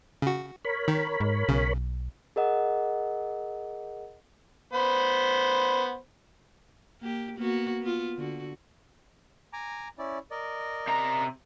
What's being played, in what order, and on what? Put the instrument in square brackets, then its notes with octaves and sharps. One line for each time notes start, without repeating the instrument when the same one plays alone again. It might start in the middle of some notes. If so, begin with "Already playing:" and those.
[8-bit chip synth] C#3 F#4
[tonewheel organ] A#4 C#5 B5
[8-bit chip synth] D#3
[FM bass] G#2
[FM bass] B1 [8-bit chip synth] C#3
[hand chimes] G#4 A#4 D#5 F#5
[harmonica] B3 C5 B5
[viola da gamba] A#3 G4
A#3 B3 F#4
B3 F4
D3 F#4
[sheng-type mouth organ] G#5 A#5 D6
C#4 E4 D5
A#4 D5 D#5
[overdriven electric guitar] C3 A#5